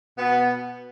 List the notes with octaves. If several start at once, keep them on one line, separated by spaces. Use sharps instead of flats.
B2 B3